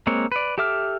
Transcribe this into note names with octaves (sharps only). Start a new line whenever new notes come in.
G#3 A#3 C4 C#5
B4 D5
G4 A4 E5 D6 F6